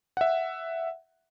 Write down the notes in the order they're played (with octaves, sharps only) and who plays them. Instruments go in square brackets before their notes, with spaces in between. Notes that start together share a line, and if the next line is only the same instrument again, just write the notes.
[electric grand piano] E5 F#5